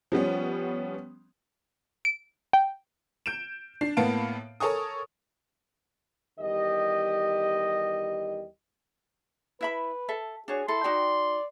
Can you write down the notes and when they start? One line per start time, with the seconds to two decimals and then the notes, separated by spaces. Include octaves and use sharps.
0.12 F3 G3 B3 C#4
2.05 D7
2.53 G5
3.26 G6 D7 E7
3.81 D4 C7
3.97 A2 A#3 B3 F5 A5 D7
4.60 A4 A#4 C#5 G#5 C#6 D#6
6.39 E2 D#3 G3 G4 D#5
9.61 E4 B4 E5 B5
10.09 A4 E5
10.48 D4 F#4 G#4 C#5
10.68 E4 A4 C6
10.84 D#4 F#4 D5 G5